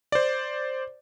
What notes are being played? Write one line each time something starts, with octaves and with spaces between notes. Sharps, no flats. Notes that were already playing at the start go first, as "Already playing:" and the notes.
C5 D5